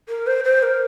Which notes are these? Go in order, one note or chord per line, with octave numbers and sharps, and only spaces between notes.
A#4
C5
C5
A#4